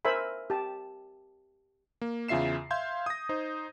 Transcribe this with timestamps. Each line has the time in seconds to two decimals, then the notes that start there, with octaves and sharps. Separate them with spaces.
0.05 A#4 C5 E5 G#5 B5
0.50 G4 A5
2.01 A#3
2.28 E2 C#3 F4 E5 C7 E7
2.71 E5 F5 C6 G6 G#6
3.06 D#6 A#6
3.29 D#4 C5